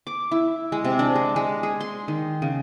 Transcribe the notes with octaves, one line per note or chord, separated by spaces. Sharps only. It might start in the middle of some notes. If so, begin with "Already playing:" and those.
D6
E4
G#3
C3
D4
G#3
G#3
G#4
C6
D#3
C#3